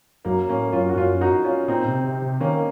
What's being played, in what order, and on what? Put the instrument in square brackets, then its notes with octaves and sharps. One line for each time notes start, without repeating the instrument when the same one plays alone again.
[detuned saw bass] F#2 [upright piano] F#3 A#3
[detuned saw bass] A2 [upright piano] A#3 C#4
[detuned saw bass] F#2 [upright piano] C#4 F4
[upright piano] F#4
[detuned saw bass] F#2 [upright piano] C#4 F4
[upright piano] D#4 F#4
C#4 F4
[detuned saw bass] A#2 [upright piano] C4 D#4
[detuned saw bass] C3
C3
C3
[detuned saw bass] D#3 [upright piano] A#3 C#4
[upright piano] A#3